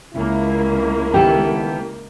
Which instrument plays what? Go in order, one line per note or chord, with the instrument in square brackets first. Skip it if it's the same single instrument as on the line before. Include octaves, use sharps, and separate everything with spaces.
[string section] C#2 A#3 [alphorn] E4
[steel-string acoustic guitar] D#3 B3 A4 [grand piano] G4